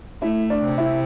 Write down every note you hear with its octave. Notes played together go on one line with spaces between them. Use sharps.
A3 E4 E5
D4 D5
C3
E4 E5